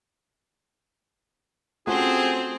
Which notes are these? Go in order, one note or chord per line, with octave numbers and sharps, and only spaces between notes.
A3 C4 C#4 F4 F#4 G#4 C5